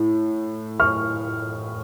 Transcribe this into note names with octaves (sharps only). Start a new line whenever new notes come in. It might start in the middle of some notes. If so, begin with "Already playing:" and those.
Already playing: A2
C#6 F6